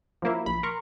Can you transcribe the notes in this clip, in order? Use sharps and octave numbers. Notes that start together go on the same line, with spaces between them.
F3 F#3 A#3 E4
A#1 B5
A#4 A#5 C6 C#6